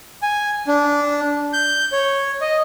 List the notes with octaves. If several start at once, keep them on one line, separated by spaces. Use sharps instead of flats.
G#5
D4
G6
C#5
D#5